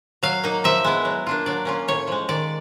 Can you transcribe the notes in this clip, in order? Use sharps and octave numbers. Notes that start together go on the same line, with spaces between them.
F#3 F5
A#3 D#4
F3 E5
G#3 B3 E4
F#3
A#3 D4 F4
F#3 D5
A#3 C#4 F4
A2 C#5
F3 G#3
D#3 D5